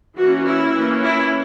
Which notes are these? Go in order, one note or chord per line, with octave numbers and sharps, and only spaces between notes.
E3 A#3 C#4 F#4
E4
E3 A#3 C#4
E4